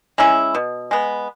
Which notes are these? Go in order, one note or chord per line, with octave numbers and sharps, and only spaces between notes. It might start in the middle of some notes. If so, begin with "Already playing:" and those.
G#3 C#4 E4
B2
G#3 B3